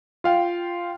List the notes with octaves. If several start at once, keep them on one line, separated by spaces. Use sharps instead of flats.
F4 F5 G5